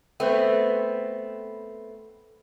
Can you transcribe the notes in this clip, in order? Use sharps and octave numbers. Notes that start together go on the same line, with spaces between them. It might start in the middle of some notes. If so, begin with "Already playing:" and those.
A3 B3 C4